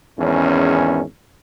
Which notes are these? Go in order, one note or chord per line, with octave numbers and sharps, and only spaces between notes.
G#1 E2 C#4